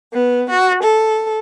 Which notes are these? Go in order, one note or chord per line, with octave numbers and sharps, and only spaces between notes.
B3
F#4
A4